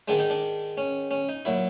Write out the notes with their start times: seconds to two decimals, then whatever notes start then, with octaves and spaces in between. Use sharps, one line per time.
0.08 G#2 D#3 G#3 D4
0.20 D#4
0.30 D4
0.78 C#4
1.11 C#4
1.29 D#4
1.45 A#2 F#3 E4